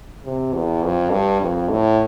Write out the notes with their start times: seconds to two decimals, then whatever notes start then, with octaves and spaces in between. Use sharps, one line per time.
0.25 C3
0.54 E2
0.84 F2
1.11 G2
1.41 F2
1.70 A2